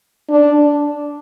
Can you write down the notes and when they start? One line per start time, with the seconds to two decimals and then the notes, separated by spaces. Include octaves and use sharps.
0.29 D4